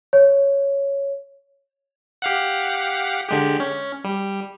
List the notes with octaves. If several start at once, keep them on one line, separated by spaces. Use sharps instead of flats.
C#5
G4 F5 F#5
D3 G#3 G4
C#4
G3